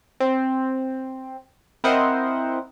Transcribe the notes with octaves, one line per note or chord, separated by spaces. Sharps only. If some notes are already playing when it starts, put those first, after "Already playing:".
C4
C4 E4 A#4 C5 D#5 F#5